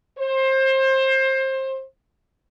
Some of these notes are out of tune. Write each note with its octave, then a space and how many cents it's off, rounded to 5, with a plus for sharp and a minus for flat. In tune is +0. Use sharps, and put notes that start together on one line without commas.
C5 +25